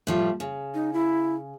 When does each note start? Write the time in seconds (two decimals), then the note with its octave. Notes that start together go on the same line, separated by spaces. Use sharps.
0.07 A2 F3 G3
0.40 C#3
0.74 D#4
0.93 E4